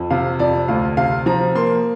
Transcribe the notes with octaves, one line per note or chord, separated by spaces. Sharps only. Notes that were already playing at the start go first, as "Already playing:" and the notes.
Already playing: F2
C3 F5
F2 D5
D2 F5
C3 F5
F3 A#5
A#3 C6